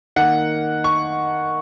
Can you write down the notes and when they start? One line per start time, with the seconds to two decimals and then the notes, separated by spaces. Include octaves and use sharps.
0.16 D#3 A#3 F#5
0.84 C#6